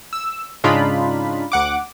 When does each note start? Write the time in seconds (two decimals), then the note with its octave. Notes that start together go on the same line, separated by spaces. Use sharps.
0.13 E6
0.64 G#2 C#3 D4 D#4 F4 B5
1.52 D2 F#5 D6